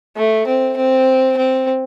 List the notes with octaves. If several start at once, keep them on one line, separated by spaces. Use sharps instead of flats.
A3
C4
C4
C4